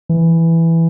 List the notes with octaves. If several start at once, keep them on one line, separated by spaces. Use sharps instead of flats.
E3